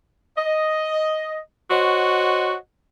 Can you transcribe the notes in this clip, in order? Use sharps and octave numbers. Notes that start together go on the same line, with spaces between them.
D#5
F#4 C5 C#5 D#5 F#5